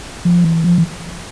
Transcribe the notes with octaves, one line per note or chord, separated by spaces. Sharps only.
F3
E3
F3
E3